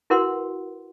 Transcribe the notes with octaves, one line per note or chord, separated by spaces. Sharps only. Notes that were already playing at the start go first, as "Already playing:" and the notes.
E4 F#4 A#4 B4 F#5 C6